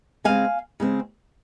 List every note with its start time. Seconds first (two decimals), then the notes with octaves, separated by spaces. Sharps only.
0.24 C#3 G#3 C4 F5 G#5
0.80 C#3 G#3 C4